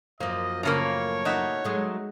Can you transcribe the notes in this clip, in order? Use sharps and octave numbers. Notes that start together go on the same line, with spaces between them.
F#2 F3 A#3 D#5
A2 C#3 A#3 C#5 F5 A#5
D#4 F#4 E5
F#3 G#3 A3